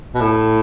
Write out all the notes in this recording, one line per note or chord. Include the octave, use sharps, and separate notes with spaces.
B2
A2